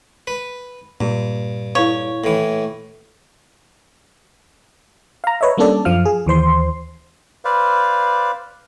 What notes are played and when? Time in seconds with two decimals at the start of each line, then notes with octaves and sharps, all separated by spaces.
0.27 B4
1.01 G2 A#2
1.75 E4 A4 C#5 F5
2.24 A2 E3
5.24 F5 A#5
5.41 B4 C#5 D#5 E5
5.57 G3 A#3 C#4 D4 A4 D5
5.85 F#2 F3 F5 F6
6.05 G#4
6.26 D#2 E3 C5 C6
7.45 B4 C5 D5 F5